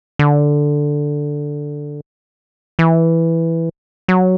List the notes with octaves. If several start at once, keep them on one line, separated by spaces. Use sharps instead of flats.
D3
E3
F#3